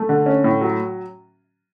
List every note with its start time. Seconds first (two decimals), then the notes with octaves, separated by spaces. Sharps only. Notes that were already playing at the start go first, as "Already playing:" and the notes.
Already playing: A3
0.09 D3
0.26 C#4
0.44 A2
0.61 F#3